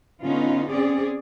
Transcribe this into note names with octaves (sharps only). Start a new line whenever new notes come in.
D3 B3 C#4 D#4 F4
C4 C#4 G#4 D5